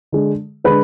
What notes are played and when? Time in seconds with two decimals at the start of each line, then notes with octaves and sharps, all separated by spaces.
0.12 D3 G#3
0.64 D3 G#3 B4